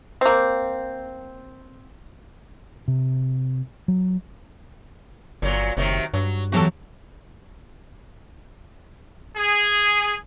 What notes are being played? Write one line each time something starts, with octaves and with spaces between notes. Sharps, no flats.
A#3 C4
C3
F#3
G1 A#2 F#3
F#1 C3 D#3 F#3
G2 F#3
E2 F#3 F#4 G4 A4
G#4